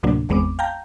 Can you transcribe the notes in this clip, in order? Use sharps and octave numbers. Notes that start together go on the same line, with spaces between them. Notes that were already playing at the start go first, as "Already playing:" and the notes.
D2 A2 C3 F#3 A#3 D4
G#1 E2 G#3 B3 C4 D6
F5 G5 A5 A#5 G6